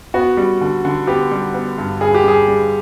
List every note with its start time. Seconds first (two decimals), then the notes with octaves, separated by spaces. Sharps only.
0.14 B3 F#4
0.37 G3
0.61 D3
0.85 D3
1.07 B3 G4
1.31 G3
1.54 B3
1.78 G2
2.01 G2 G#4
2.14 G4
2.24 G3 G#4
2.48 G3